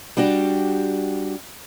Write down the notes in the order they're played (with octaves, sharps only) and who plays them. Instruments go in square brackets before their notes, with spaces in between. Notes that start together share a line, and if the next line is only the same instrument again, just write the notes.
[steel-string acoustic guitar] G3 D4 F#4 G4